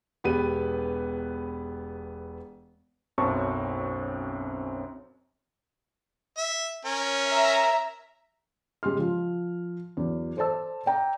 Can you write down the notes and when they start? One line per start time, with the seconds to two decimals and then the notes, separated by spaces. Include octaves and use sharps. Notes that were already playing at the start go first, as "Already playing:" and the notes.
0.24 E1 B3 G4 B4 D#7
3.18 B1 F#2 C4 C#4 A5 C#6
6.37 E5
6.85 C#4 A#4
7.29 E5 A#5
8.83 C#3 G#3 G4 C6 F6
8.99 F3
9.97 E2 F#3
10.37 A4 C5 D5 A5 E6
10.86 D5 G5 A#5